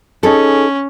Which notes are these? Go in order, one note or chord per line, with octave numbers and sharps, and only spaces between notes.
C#4 D#4 G#4 A4